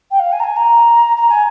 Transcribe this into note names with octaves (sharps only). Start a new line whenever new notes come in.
G5
F5
G#5
A#5
G#5
A#5
A#5
G#5